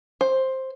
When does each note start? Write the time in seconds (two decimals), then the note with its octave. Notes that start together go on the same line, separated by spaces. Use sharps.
0.21 C5